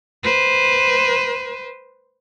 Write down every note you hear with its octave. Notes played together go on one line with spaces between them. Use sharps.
B4 C5